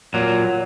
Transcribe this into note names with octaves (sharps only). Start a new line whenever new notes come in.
A#2 F#3